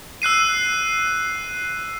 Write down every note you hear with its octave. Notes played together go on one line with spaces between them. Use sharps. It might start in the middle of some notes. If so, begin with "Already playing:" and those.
E6 F#6 C7 D#7